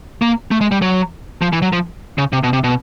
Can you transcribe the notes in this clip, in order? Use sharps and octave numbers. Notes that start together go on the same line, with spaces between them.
A#3
A3
G#3
G3
F#3
F3
E3
F#3
F3
C#3
C3
B2
C3
B2